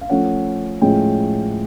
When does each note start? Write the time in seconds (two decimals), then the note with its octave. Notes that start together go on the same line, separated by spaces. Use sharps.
0.01 F5
0.09 F3 A3 C#4 F#5
0.82 A2 F3 G#3 C#4 G5